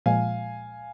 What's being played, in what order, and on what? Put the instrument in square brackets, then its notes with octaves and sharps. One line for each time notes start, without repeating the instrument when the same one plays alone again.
[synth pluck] A#2 F3 G#3 [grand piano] F5 G#5